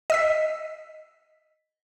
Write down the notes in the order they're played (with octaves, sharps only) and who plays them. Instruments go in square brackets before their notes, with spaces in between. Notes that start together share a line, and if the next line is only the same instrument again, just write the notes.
[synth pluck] D#5 E6 B6